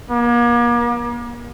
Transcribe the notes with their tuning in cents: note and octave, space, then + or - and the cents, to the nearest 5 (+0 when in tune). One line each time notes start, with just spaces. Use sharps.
A#3 +40